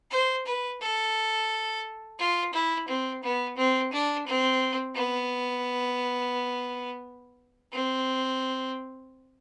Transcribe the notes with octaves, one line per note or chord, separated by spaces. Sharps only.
C5
B4
A4
F4
E4
C4
B3
C4
D4
C4
B3
C4